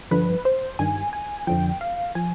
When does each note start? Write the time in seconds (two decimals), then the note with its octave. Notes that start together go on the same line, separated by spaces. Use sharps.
0.11 G2 D3 F3 B4
0.45 C5
0.79 G2 D#3 G#5
1.13 G#5
1.47 F2 D3 F3 G5
1.81 F5
2.15 F3 G#5